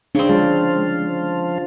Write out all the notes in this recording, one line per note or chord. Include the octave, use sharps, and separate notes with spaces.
C#3 C4 D4
F3 G#3 F4